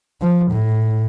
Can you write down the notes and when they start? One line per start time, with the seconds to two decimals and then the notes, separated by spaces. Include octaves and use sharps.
0.21 F3
0.51 A2